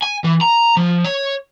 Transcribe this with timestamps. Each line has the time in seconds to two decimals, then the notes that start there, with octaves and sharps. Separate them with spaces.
0.02 G#5
0.24 E3
0.41 A#5
0.77 F3
1.04 C#5